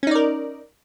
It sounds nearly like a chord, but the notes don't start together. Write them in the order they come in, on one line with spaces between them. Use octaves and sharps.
C#4 D#4 D5 A#4